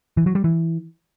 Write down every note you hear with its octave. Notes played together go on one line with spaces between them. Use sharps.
E3
F#3
G3
E3